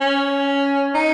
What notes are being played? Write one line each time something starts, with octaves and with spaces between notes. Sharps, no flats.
C#4
D#4